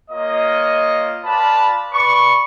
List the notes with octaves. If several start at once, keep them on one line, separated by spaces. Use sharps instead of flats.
A#3 F4 C#5 D#5
F4 B4 D5 A5 B5
B4 D5 C#6